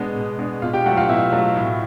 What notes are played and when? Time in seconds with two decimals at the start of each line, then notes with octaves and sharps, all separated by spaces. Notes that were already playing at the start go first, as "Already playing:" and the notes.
Already playing: B2 G#3 B3 D4
0.16 B2
0.38 G#3 B3 D4
0.62 B2 F4 F5
0.73 G4 G5
0.85 F#3 A3 F#4 F#5
0.97 F4 F5
1.09 B2 E4 E5
1.32 F#3 A3
1.56 A2